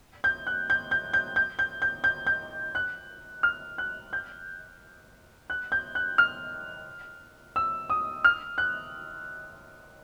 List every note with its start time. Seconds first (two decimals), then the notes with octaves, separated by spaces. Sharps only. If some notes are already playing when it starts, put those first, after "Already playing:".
0.24 G6
0.47 F#6
0.70 G6
0.91 G6
1.13 G6
1.36 G6
1.59 G6
1.82 G6
2.04 G6
2.27 G6
2.75 F#6
3.43 F6
3.78 F#6
4.13 G6
5.50 F#6
5.72 G6
5.95 F#6
6.18 F6
7.56 E6
7.90 D#6
8.24 F6
8.58 F#6